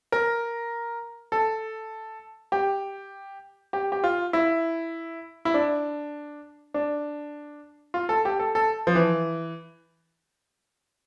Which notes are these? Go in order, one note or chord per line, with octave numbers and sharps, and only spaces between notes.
A#4
A4
G4
G4
G4
F4
E4
E4
D4
D4
F4
A4
G4
A4
A4
F3
E3